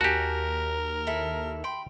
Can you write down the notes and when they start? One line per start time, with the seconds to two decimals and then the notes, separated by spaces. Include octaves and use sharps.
0.01 D#2 F#4 G4 A#4 G#5 A5
1.07 E4 A4
1.64 G5 B5 C6